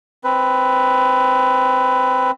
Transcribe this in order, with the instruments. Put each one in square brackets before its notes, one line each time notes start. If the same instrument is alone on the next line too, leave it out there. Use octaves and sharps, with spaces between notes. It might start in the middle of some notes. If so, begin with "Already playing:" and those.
[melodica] C4 B4